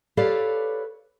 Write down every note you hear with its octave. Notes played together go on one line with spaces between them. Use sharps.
G4 A4 B4 C#5 D5 F5